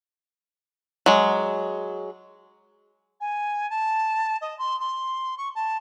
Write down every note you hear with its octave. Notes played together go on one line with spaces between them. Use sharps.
F#3 G#3
G#5
A5
D#5
C6
C6
C#6
A5